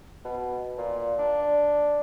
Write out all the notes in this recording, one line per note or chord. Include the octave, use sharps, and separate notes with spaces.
B2
A#2
D4